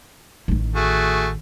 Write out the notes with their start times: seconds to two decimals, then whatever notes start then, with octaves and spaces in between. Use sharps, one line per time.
0.48 A1 D#3
0.76 A3 F#4 G#4